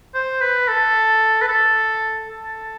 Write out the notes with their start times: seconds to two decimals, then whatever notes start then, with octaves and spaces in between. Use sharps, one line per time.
0.14 C5
0.41 B4
0.68 A4
1.41 B4
1.48 A4
2.29 A4